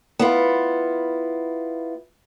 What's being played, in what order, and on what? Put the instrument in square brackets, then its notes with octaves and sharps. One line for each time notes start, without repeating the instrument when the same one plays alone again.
[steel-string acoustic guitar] B3 E4 F4